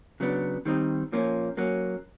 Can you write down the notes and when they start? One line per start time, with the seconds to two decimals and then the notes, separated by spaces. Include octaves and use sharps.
0.20 C#3 F#3 B3 D4
0.65 D#3 G3 C4 D#4
1.12 A#2 F3 A#3 C#4 F4
1.57 F#3 A#3 C#4